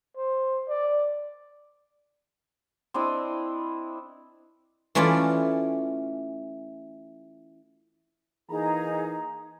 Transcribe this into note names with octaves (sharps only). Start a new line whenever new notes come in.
C5
D5
C4 D4 E4 D#5
E3 A3 C#4 F4 D5
E3 A#3 D#4 G#4 A#5